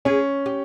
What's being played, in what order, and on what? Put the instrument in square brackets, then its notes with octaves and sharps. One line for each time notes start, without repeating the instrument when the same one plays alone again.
[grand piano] C#4 [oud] G#4
[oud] G4